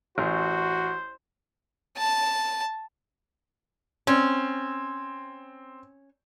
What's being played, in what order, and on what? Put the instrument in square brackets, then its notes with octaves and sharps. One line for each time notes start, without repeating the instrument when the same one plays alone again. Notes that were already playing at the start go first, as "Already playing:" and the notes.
[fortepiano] A1 [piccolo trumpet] F#4 [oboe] C5
[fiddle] A5
[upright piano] C4 [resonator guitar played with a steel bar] C#4